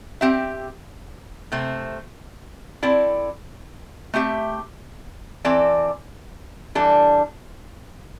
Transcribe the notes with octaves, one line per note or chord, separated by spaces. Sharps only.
C4 G4 E5
C3 A3 C4
C4 E4 A4 D5
A3 C4 G4 E5
E3 C4 A4 D5
E3 G3 D4 A4